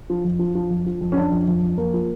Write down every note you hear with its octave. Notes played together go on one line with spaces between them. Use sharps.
F3
F2
F3
F3
F2
F3
F2
C#4
F2 D4
F2
F2
F2
F2 A#3
F3